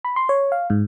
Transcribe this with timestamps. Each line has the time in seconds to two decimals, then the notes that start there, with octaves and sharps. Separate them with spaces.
0.05 B5
0.16 C6
0.29 C#5
0.52 F5
0.70 G#2